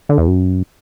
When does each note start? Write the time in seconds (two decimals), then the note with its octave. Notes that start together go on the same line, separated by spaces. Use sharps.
0.09 D3
0.18 E2
0.28 F#2